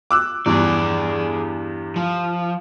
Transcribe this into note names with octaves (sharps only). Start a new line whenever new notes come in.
D6 E6 F#6
E2 G2 G#4 D5
F3